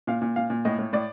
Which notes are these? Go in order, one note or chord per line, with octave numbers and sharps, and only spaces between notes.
A#2 F5
A#2
A#2 F5
A#2
A2 D#5
A2
A2 D5